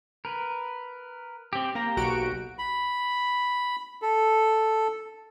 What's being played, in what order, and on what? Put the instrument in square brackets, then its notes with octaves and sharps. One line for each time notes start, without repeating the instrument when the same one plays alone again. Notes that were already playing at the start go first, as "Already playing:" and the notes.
[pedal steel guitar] A#4 B4
C4 G4
[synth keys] A#3 [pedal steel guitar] G4 A#5
[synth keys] B1 F#4 D7
[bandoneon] B5
A4